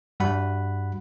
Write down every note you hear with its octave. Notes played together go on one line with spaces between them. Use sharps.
G2 G3 F#4 F#5 B5